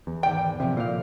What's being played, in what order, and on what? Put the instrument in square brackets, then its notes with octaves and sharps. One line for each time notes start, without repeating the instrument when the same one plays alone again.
[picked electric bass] E2
[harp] G#1 D5 G6 [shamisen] G5
[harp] C2 A2 F3 [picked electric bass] C3
[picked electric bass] A#2 [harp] C5 F5